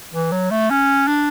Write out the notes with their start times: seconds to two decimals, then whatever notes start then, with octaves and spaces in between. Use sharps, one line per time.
0.12 E3
0.32 F#3
0.51 A3
0.70 C#4
1.08 D4